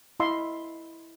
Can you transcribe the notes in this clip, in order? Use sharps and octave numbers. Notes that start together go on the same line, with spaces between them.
E4 D#5 F5 B5 C6 E6